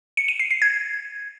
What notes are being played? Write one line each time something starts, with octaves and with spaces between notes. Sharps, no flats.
C#7
D#7
C7
C7
G#6